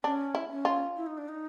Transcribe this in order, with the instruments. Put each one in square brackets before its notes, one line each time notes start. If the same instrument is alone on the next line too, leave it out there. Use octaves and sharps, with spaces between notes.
[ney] C#4 [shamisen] D4
[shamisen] E4
[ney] C#4
[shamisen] F4
[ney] E4
D#4
D4
D#4